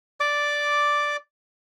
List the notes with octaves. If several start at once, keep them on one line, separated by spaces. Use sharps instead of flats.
D5 D6